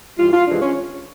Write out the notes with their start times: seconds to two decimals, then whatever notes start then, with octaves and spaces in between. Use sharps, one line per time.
0.17 G2 E3 G3 F4
0.33 F4
0.46 F2 C3 E3 G#3 D4
0.61 C#4